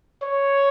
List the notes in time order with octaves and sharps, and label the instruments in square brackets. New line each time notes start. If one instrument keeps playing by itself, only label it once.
[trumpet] C#5